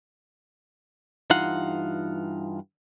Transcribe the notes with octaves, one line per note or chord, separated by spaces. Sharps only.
G2 E3 D#4 F4 F5 F#5